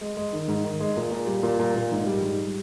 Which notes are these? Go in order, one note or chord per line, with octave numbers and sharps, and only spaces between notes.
G#3
G#3
D#3
G#2
D#3
G#3
A#2
A#2
G3
A#2
A#2
A#2
G#2
G3
G#2